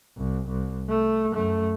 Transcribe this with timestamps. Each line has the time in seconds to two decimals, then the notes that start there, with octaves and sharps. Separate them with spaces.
0.18 C2
0.48 C2
0.89 A3
1.32 F#2 A3